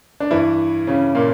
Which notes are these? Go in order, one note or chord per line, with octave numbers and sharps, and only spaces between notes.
D4
G2 E3 E4
C#3 C#4
A#2 A#3